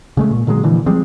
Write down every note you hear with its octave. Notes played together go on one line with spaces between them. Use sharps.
C#3 G#3 A3
A#2
A#2 D3 F#3 G#3
A#2 D3 E3 F3
F3 G3 G#3 C4